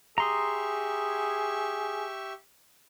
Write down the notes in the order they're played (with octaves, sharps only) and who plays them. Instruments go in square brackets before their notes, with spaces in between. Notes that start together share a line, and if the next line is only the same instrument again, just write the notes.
[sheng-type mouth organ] G4 E5 C#6 [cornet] G#4 [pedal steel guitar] A#5 C6 D#6